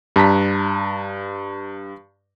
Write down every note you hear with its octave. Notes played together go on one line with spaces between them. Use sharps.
G2 A5 A#5 B6